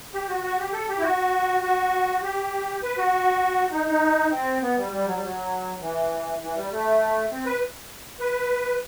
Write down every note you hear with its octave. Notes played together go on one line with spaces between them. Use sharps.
G4
F#4
F#4
G4
A4
G4
E4
F#4
F#4
G4
B4
F#4
D#4
D#4
C4
B3
G3
G3
F#3
G3
F#3
E3
E3
G3
A3
C4
B4
B4